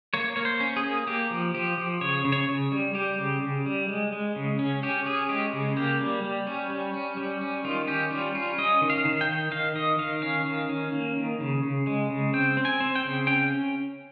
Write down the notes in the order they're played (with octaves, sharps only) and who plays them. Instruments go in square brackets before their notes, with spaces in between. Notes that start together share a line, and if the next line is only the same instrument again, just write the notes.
[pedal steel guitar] A#3 C#5
A#3 C#5
C5
C#4
G#4
A#3
A#3 G4
F3
F3 G4
F3
C#3 C#5
C#3
C#5
C#3
G3
G3 G4
C#3
C#3
G3
G#3
G#3
C#3
C#4
C#4 G4
C#4 G#4
G#3 G4
C#3
A#3 G4
G3
G3
C#4
G3
C#4
G3
C#4
D#3 F4
C#4 G4
G3 F4
C#4 F4
C#4 D#5
D#3
F5
D#3
G5
D#3
D#3 F5
D#3 D#5
D#3 F5
C#4 F5
D#3
C#4
A#3
D#3
C#3
C#3
G#3
C#3
C4 G5
C4
G#5
C4
G5
C#3
C#4 G5